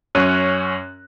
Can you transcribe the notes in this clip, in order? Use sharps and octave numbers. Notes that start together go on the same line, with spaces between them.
F#2 C#4 C#5 F#6 D#7